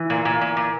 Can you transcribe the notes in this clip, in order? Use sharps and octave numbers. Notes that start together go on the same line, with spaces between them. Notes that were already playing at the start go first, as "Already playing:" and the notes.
Already playing: E3
A#2
A#2
A#2
A#2